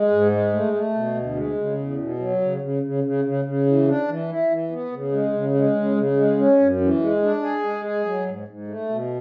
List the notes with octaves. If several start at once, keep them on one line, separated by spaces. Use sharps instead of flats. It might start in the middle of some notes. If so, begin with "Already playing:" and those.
Already playing: G#3
G#2
G#3
A3
A3
B2
D2
G#3
C#3
E2
B2
F#3
C#3
C#3
C#3
C#3
C#3
C#3
E3
D4
E3
E4
E3
B3
C#3
G#3
C#3
G#3
C#3
C#3
G#3
C#4
F#2
E3
G#3
D4
G#4
G#3
G#4
F#3
G#2
G#2
A3
B2